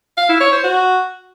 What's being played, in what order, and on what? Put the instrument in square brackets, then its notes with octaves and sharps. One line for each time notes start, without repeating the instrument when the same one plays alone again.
[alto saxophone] F5
E4
C#5
C5
F#4